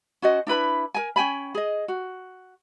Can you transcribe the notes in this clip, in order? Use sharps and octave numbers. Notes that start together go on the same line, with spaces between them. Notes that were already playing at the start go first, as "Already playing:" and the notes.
C#4 F#4 C5 D#5
D4 E4 B4 B5
A#4 G#5
C#4 G5 G#5 B5
G#4 D#5
F#4